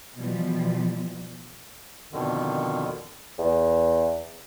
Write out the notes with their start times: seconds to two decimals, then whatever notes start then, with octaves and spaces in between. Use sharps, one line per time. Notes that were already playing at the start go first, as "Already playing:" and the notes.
0.16 B2 E3 F3 G3
2.13 F2 B2 D3 D#3
3.38 E2